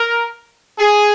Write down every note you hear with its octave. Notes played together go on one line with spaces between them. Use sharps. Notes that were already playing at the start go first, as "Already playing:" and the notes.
Already playing: A#4
G#4